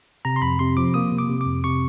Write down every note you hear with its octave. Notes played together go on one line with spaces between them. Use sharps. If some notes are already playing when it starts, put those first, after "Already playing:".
C3 A#5
C6
F2 B5
C3 C6
F3 D6
A#3 D#6
C3
D6
C3
D6
F2
C3 C#6